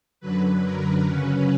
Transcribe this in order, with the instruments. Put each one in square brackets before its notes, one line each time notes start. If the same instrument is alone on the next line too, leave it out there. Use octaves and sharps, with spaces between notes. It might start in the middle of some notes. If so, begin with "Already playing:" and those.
[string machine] F#2 D3 F#3 B4
A#4
C#3 F#3 C#4 B4